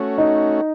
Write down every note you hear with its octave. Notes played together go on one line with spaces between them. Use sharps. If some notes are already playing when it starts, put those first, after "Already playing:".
Already playing: A3 C#4 F#4
D#4